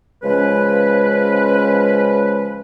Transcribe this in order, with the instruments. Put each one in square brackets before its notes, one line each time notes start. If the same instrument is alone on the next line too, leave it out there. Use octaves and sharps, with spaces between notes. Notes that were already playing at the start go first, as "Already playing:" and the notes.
[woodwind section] C#3 F3 G#3 C#4 B4